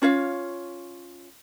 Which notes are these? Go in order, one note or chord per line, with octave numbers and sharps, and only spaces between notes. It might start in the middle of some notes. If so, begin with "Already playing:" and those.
C#4 F4 C#5 F5